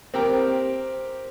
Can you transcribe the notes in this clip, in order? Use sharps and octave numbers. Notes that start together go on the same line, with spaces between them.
C4 G4 A#4